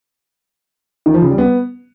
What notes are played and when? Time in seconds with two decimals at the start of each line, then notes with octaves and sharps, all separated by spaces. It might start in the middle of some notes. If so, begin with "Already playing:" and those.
1.06 D#3
1.14 F3
1.22 C#3
1.30 G3
1.38 B3